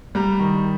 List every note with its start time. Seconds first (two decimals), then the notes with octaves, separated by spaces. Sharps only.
0.15 G3 A#5
0.39 D#3